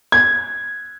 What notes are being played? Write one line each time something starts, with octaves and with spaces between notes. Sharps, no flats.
G#6